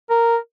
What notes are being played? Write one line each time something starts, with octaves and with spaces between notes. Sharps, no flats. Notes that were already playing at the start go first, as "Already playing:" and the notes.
A#4